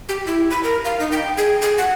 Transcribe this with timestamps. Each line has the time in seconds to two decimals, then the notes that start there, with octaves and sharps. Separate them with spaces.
0.09 G4
0.27 E4
0.50 B5
0.63 A#4
0.85 F5
1.00 D#4
1.12 G5
1.37 G#4
1.62 G#4
1.78 F#5